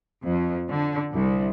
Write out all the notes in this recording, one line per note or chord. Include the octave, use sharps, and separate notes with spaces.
F2
D3
C2